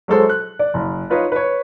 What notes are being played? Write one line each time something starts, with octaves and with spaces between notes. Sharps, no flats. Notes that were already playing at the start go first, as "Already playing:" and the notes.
F#3 G#3 A4 C5
F#6
D5
F#1
D#4 F4 B4 C#5 D#5 F5
B4 C#5